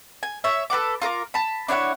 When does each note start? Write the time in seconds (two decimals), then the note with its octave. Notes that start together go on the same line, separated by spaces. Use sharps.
0.23 G#5
0.44 C#5 E5
0.70 A4 B4 F#5 D6
1.02 F4 A#4 A#5 D6
1.34 A5 B5
1.68 D4 E4 C#5 F#5